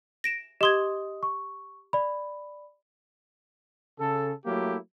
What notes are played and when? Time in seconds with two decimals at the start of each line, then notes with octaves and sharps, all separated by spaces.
0.24 A#6 D7 E7
0.61 G4 D#5 C6 D#6 G#6
1.23 C#6
1.93 D5 B5
4.00 C#3 A4
4.46 F#3 A3 A#3 E4 G4